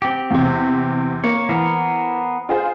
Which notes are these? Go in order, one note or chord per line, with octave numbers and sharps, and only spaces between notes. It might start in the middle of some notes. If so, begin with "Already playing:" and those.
C4 G4
E2 C3
A#3 C#5
E3 B3 A#4 C5
F4 G#4 C5